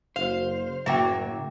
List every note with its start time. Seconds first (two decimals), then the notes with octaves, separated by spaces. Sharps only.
0.16 F#1 C5 F5
0.86 F#1 A2 C#3 F#3 A#3 E5 G5